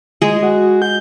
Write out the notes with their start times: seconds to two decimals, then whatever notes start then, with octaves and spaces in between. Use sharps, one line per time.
0.22 G#3 G#4 D#5
0.43 F#4
0.82 G6